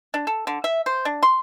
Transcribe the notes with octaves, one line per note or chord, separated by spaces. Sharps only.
D4
A4
D3
E5
C5
D4
C6